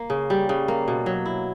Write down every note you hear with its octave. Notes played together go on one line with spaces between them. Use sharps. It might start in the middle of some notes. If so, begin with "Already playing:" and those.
Already playing: A#3
C#3
G3
C#3
A#3
B2
F#3
E4